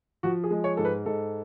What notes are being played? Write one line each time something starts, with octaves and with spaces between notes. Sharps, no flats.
F3 F#4
G#4
G#3
C#5
G#2 A4
B4
G#2 A4